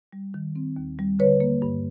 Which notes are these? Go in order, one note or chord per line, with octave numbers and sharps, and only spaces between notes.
G3
D#3
C4
D#2
G3
D3 B4 C#5
A#3
G2